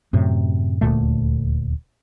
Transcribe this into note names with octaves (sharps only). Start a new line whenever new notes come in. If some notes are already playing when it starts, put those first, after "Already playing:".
F#2 A2 C3
D#1 D2 A#2 A3